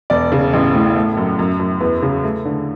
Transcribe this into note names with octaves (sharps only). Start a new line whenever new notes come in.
E1 D5
C#3
A1
A2
A3
F#2
F#2
F#2
E2 B4
C#3
A3
D3